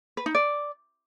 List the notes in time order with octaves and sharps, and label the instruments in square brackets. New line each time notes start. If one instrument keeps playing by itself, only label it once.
[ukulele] B4
D#4
D5